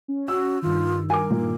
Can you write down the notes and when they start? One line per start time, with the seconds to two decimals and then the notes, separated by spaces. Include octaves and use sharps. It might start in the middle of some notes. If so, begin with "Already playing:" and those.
0.08 C#4
0.28 F#4 E6
0.62 G2 D#3 F4
1.10 A#4 G#5 D6
1.31 A#2